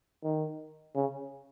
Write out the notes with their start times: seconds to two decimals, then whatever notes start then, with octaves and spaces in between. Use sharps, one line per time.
0.24 D#3
0.95 C#3